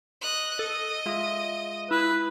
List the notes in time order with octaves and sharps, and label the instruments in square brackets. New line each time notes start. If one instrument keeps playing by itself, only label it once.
[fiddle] D#5 F#6
[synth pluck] A4 [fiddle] D#5
[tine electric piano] G#3 F4 E5
[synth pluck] E4 [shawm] B4